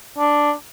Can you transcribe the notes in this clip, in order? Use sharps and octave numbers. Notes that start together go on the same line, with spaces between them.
D4